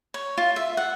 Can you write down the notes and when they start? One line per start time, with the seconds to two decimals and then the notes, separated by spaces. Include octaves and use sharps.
0.14 C#5
0.38 F4
0.56 E5
0.77 F#5